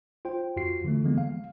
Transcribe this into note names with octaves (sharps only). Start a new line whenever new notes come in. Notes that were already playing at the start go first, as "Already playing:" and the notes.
F4 C5 G5
F2 F4 F#4 C7
D3 E3 A3
D3 E3 F3 G#3 A#3 B3
F5